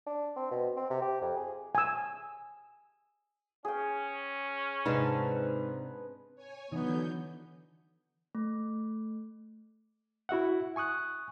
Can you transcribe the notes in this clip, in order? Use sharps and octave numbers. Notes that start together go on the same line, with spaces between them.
D4
C4
B2
C4
C3
G4
F2
G#4
G#5 E6
C#4 G#4 G5
G#2 C3 D4 D#4 B4
C#5 G#5
D3 E3 F#3 B3 D#4 G6
A3
E4 F#4 E5 F#5
G#5 C#6 D#6 F#6